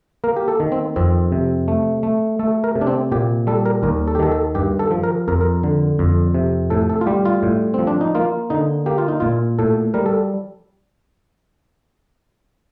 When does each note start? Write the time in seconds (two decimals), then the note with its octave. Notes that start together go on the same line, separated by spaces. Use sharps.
0.24 A#3 A#4
0.36 G4
0.48 A4
0.60 D#3
0.72 C4
0.96 F2 C4
1.32 C3
1.68 A3
2.03 A3
2.39 A3 A4
2.64 A#4
2.75 C3
2.81 D4
2.87 C4
3.12 A#2 G4
3.47 G3 A4
3.66 A#4
3.83 D#2 A#4
4.08 A4
4.15 G4
4.19 D#3 A4
4.32 A4
4.55 G2 G4
4.79 A4
4.91 F3
5.03 A#4
5.28 F2 A#4
5.41 A#4
5.63 D3
5.99 F2
6.34 C3
6.70 A2 A4
6.90 A4
7.01 F4
7.07 G3 G4
7.25 F4
7.43 A2
7.74 F3 C4
7.87 D4
8.01 D#4
8.15 A#3 F4
8.50 D3 D#4
8.86 A#3 G4
8.98 F4
9.08 D#4
9.20 A#2 F4
9.59 A2 A4
9.94 G3 A#4
10.06 A4